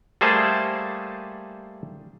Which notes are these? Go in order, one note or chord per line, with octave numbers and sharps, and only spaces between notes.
G3 A3 A#3 G#4 C5 A5